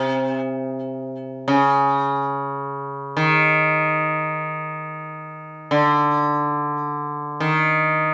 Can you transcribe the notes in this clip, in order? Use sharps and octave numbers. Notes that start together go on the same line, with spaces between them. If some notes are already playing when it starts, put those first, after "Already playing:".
Already playing: C3
C#3
D#3
D3
D#3